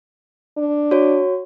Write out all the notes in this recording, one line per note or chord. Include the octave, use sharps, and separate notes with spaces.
D4
F#4 C#5